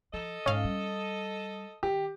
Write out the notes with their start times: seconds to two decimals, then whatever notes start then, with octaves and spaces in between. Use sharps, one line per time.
0.13 F3 A4 D#5
0.46 G#2 C#4 F5
0.64 G3
1.83 D#3 G4